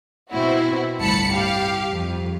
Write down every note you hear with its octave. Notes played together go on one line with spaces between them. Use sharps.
B2 C4 E4 F#4
G1 C2 A2 A5 B5 C#7
G4 F5
F2